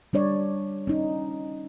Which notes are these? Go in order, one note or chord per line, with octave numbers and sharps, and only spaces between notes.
G3 D4 C#5 D5
C#4 D#4